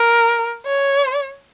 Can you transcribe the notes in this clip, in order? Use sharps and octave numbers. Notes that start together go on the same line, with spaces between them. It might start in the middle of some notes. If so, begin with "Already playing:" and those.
Already playing: A#4
C#5